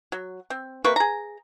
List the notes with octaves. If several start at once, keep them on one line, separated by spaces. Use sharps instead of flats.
F#3
C4
C3 A#3 B4 C#6
G#4 A#5